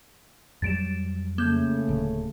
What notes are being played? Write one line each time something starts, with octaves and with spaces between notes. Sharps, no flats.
F2 F#3 G3 A6 D7 E7
C#3 A3 A#3 G6
D1 D3